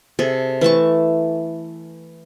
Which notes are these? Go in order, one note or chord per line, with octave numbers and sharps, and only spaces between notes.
C3 G#4 A4
E3 A3 A5 C#6